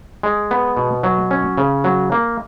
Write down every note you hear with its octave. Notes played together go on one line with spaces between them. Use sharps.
G#3
B3
B2
F#3
C#4
C#3
F#3
A#3